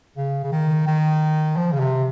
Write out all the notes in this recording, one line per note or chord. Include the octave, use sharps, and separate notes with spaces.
C#3
C#3
D#3
D#3
F3
C#3
C3